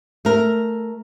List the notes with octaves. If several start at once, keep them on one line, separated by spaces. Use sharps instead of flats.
A3 A#4